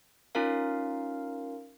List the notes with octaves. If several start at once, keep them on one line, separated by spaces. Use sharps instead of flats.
C#4 D#4 F4 A#4 F5